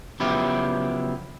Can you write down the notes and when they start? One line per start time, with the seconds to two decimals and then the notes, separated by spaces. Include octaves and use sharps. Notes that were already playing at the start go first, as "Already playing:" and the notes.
0.20 C#3 F3 F#3 B3 E4 G4